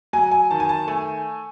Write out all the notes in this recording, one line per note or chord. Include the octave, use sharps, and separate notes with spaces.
F#3 G#5
G#5
D#3 A5
G#5
A5
A3 G#5